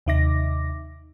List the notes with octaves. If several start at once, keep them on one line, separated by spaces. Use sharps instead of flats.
D#2 C3 D#4 E5 D6 A#6